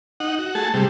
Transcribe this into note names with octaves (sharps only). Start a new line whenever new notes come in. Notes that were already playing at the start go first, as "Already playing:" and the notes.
D#4 F#5
F#4
A3 G#4 A5
C3 G3